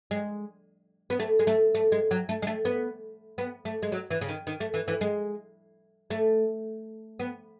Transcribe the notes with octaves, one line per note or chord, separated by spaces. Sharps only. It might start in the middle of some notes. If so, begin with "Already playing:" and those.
G#3
B3
A3
G#3
A3
A3
G#3
F#3
A3
G#3
A3
B3
B3
A3
G#3
F#3
E3
C#3
D#3
D#3
A3
E3
E3
G#3
A3
B3